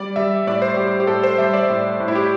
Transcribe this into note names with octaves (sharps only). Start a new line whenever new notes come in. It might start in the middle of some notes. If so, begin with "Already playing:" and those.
Already playing: G3 D5
G3 E5
A2 D5
C5
G3 G4
G4
A2 A4
C5
G3 E5
D5
A2
A2
E4
G4